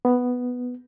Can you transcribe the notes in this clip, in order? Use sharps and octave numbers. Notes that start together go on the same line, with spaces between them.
B3